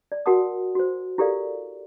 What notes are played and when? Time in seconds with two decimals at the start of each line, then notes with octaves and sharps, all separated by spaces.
0.12 D5
0.26 F#4 A#4 F#5 A5 D#6
0.75 F#4 C5
1.18 E4 G4 A4 A#4 D5 F5